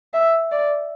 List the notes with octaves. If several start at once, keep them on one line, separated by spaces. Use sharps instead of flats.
E5
D5